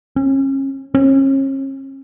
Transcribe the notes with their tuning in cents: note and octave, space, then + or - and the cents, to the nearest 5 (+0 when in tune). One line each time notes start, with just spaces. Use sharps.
C#4 -35
C#4 -40